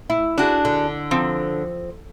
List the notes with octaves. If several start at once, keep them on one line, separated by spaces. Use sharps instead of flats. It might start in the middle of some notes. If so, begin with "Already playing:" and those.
E4
D4 F#4 G#4
D3
F3 C4